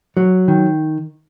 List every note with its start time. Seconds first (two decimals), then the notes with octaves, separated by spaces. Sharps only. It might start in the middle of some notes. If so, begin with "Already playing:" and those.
0.17 F#3
0.48 D#3